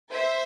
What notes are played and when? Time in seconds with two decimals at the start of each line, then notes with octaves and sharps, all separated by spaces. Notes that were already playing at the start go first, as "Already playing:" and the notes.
0.11 C5 E5